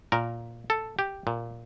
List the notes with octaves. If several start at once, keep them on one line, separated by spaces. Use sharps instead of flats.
A#2 A#4
A4
G4
A#2